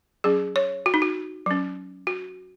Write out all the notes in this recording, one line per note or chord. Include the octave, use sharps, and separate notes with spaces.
F#3 C#4 G#4
C#5
F#4
D#4
F#4
F#3 C#4
F#4